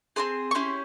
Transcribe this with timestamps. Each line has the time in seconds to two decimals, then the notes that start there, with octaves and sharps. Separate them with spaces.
0.16 C4 F4 G#4 C6
0.51 C#6
0.55 C#4 E4 G4 C6